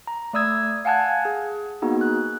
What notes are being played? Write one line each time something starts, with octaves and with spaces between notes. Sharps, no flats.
A#5
A3 D5 D#6 E6 G#6
F5 F#5 G#5 A5 F#6 G#6
G#4
A#3 B3 D#4 F#4 G#4
F#6